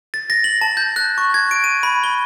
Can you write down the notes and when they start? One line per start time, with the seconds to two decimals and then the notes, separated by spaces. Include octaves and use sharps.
0.14 A6
0.30 A#6
0.44 F#7
0.61 A5
0.77 G6
0.96 F#6
1.18 C#6
1.34 G#6
1.51 D7
1.64 D#7
1.83 B5
2.04 G7